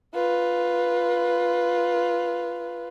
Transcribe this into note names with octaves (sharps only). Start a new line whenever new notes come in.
F4 B4